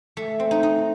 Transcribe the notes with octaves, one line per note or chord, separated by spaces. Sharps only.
A3
C4
D#4
D#4